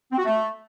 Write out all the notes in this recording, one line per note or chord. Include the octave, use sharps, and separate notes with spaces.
C4
F#4
A3